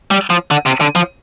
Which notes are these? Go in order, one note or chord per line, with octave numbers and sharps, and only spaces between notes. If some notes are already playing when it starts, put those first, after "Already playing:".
G3
F3
D3
C3
D3
F3